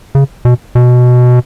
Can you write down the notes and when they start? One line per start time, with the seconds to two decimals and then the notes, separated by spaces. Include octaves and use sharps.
0.15 C#3
0.45 B2
0.75 B2